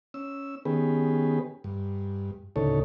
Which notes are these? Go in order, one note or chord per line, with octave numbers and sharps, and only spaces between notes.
C#4 E6
D#3 B3 C#4 G4 G#4 B4
G2
D2 A2 C#3 D#4 A4 C#5